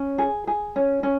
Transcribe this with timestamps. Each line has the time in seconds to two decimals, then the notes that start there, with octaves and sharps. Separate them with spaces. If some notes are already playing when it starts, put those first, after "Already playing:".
Already playing: C#4
0.18 G#4
0.47 G#4
0.76 C#4
1.03 C#4